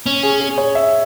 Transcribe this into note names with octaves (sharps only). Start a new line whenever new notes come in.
C#4
G#4
G#4
C#5
E5